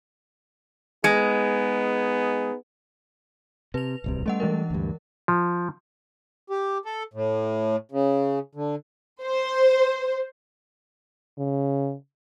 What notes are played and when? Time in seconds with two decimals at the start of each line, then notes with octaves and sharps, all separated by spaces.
1.04 G#3 B3 D#4 G#4
3.74 C3 B4 F7
4.04 D1 C2 C3
4.26 G3 A3 C#4 D#5 F#5
4.40 E3 G#3 A#4
4.70 D2 G2
5.28 F3
6.50 G4
6.85 A4
7.14 A2
7.92 C#3
8.55 D3
9.23 C5
11.38 C#3